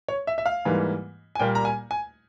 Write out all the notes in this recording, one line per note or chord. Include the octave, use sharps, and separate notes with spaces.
C#5
E5
E5
F5
G#2 E3 G3 A#3
G#5
A#2 G3 A#3 G5
A#5
G#5
G#5